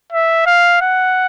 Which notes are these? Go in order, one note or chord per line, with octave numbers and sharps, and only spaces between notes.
E5
F5
F#5